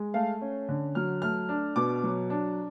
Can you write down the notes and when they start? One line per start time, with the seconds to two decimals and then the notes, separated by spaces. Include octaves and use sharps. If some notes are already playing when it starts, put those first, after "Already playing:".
Already playing: G#3
0.14 A3 F5
0.41 C#4
0.69 D3
0.95 F#3 F6
1.22 A3 F6
1.49 D4
1.76 B2 D6
2.03 F#3
2.30 D4